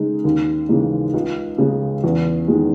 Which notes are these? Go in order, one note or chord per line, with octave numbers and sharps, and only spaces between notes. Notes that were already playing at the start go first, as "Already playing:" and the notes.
Already playing: C#3 G#3 D#4
D#2
C#3 E3 G#3 D#4
C#2
C#3 G#3
E2
D#3 G#3